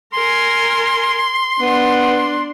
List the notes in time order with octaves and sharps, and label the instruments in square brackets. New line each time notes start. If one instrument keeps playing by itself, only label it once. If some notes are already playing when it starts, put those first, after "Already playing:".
[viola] A#4 G#5 [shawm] C6
[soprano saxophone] B3 [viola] D4